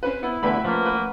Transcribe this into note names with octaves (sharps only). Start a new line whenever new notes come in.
C4 C#4 B4
B3 E4
E2 D3 A3 B4 E5 F#5 G5 B5
F3 A#3 C#4
B4